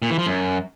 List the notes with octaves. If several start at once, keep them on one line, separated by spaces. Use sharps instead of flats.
A#2
E3
F3
F#2